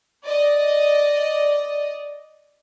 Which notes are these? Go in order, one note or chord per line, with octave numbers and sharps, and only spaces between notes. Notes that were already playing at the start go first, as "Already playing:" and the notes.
D5 D#5